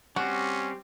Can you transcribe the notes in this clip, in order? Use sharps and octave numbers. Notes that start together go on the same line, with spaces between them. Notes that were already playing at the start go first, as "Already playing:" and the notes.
G3 C4 C#4 F#4